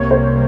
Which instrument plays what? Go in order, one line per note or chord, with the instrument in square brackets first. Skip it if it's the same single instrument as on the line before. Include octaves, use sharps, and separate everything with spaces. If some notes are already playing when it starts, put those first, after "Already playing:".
Already playing: [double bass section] C2 C3 G3 A#3 [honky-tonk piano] C#5
[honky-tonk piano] C5